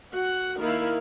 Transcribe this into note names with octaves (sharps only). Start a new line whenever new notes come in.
F#4 F#5
D#3 A#3 E4 A#4 F5